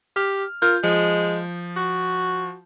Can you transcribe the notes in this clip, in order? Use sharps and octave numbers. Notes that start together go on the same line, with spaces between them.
G4 F6
F4 A#4 G6
F3 G#3
F#4